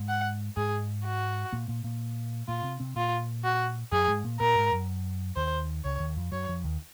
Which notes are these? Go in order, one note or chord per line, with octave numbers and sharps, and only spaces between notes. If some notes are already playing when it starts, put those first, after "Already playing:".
Already playing: G#2 G#3
F#5
G#2 G#3 G#4
F#4
A#2 A#3
A#2 A#3
A#2 A#3
A#2 A#3 F4
C3 C4
C3 C4
A#2 A#3 F4
F#4
F#2 F#3 G#4
G#2 G#3
A#2 A#3
A#2 A#3 A#4
G#2 G#3
F#2 F#3
D#2 D#3 C5
C#2 C#3 C#5
D#2 D#3
F2 F3
F#2 F#3 C#5
F2 F3
D#2 D#3